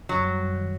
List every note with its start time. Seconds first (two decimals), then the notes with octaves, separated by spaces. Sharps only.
0.09 F#2 F#3
0.24 G3
0.40 F#2
0.56 D#3